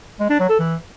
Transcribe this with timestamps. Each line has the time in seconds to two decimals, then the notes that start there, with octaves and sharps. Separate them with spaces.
0.20 G#3
0.30 D4
0.39 F#3
0.49 A4
0.59 E3